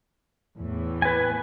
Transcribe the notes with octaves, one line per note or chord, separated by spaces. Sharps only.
E2 A2 E3
B4 G#5